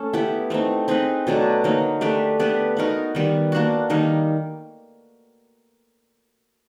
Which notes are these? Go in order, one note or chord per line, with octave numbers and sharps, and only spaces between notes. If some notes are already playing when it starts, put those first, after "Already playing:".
Already playing: A3 C#4 A4
B3 E4 G4
A3 C4 D#4
C4 D#4 G#4 B4
B2 F#3 A3 D4
D3 F#3 A#3 D#4
A3 D4 G4 B4
B3 D4 G4 B4
B3 D#4 F#4 A#4
D#3 G3 B3
A#3 D4 F#4
D#3 G3 A#3 D#4